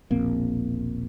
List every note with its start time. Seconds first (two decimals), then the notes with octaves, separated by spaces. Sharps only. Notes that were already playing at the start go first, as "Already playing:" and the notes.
0.11 E1 A#1 A#3 C4